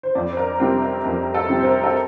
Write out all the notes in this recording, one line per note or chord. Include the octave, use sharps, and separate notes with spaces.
C5
F2 D5
C5
A#4
C3 G3 C4 A#4
A#4
F2 A#4
A4
C3 G3 C4
C5
A#4
A4